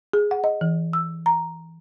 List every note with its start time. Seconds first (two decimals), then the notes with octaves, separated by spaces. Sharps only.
0.13 G#4
0.31 F#5
0.44 D#5
0.61 E3
0.93 E6
1.26 A#5